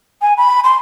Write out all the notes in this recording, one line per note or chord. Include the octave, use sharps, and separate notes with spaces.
G#5
B5
C6